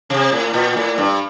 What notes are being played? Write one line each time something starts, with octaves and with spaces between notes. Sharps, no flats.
C3
A2
A#2
A2
G2